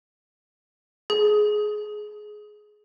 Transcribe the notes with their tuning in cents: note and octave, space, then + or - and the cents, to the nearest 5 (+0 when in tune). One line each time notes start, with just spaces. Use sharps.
G#4 +20